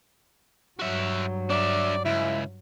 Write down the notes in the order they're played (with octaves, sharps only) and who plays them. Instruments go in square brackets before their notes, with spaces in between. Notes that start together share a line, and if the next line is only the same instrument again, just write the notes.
[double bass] G2 F#3 [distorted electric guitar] F#4 E5
[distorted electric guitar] D4 E5 [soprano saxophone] D5
[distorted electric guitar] C#2 [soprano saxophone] E4